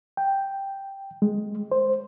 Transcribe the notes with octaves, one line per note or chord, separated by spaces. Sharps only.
G5
G#3
C5